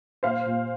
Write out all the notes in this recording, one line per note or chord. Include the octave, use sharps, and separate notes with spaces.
A#2 C5 F5
A#2